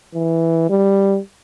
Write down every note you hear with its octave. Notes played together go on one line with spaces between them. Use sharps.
E3
G3